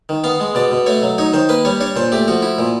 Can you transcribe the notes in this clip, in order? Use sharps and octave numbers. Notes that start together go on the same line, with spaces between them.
D#3
B3 F5
G#3
B2 D5
B2
A3 C#5
F#3
D#4 C#5
D#3 C5
A#3 B4
G3 C#5
D4 C#5
A#2 C5
A3 G4
F3 F#4
E4
A#2